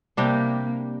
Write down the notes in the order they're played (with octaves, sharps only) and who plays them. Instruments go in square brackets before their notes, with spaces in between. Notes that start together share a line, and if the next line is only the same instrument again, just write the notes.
[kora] C3 G3 D4 G4 [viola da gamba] A#3